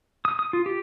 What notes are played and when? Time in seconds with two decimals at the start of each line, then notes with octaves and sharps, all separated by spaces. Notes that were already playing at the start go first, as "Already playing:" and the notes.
0.25 D#6
0.39 D#6
0.53 F4
0.66 G4